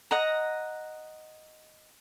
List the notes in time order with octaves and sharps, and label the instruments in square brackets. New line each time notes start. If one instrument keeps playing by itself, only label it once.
[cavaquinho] D#5 F#5 A#5